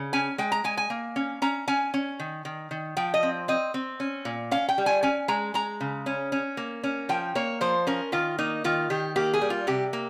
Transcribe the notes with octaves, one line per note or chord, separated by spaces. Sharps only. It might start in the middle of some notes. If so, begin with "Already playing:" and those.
Already playing: C#3
C#4 G#5
G#3 G5
A#5
G#3 G#5
G#5
A#3
C#4
C#4 A#5
C#4 G#5
C#4
D#3
D#3
D#3
F3 G5
D#5
C4
C4 D#5
C4
C#4
A#2
C#4 F5
G5
G3
G#5
C#4 G#5
G#3 A#5
G#3 A#5
C#3
C#4
C#4
A#3
C#4
F3 G5
A#3 C#5
F3 C5
C#4 A#4
D#3 F4
A#3 D#4
D#3 F4
D#3 G4
A#3 G4
G#4
G3
F4
C3 G4
A#3